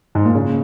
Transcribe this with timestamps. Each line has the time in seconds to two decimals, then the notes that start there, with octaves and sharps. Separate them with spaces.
0.15 G#2
0.25 A#2
0.34 C#3